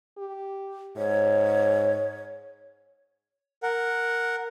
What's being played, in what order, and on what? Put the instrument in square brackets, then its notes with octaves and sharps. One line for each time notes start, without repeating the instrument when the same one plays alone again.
[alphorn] G4
[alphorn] G#2 [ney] C#5
[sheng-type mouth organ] A#4 F#5